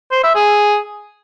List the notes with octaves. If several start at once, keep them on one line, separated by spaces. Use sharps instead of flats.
C5
E5
G#4